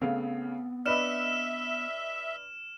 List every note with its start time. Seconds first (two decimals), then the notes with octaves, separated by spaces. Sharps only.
0.01 C#3 A3 B3 C4 F5
0.86 D4 B4 D#5 E5 F6 E7